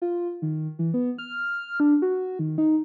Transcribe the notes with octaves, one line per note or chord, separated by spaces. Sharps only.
F4
D#3
E3
B3
F6
D4
F#4
D#3
D#4